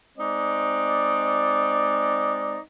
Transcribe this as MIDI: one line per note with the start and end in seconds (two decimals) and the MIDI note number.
0.17 2.58 56
0.17 2.58 60
0.17 2.58 63
0.17 2.58 74